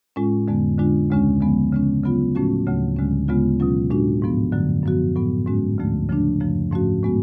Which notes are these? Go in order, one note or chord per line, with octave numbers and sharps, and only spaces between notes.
A2 G#3 C#4 F4
F2 D3 G#3 B3
D3 G#3 D4 F4
D2 C#3 G#3 C#4
D3 F3 G#3 B3
C#3 G#3 C#4
C#3 F#3 B3 F4
A2 F3 A3 C#4 F#4
D2 C#3 F#3 A3
D2 D3 G#3 C#4
D2 C#3 G#3 B3 F4
B2 F#3 C#4 F4
A2 G#3 D4 F#4
G#2 F3 B3
F#2 D3 F#3 A3
F#2 F3 B3 F#4
A2 F#3 B3
G#2 G#3 C#4 F#4
D2 D3 F3 A3
C#3 F3 A3 D4
F#2 C#3 F3 A3
G#2 F3 A3 C#4 F#4
A2 G#3 B3 F#4